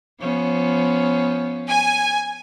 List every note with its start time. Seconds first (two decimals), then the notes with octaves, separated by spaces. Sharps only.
0.19 F3 B3 C#4
1.69 G#5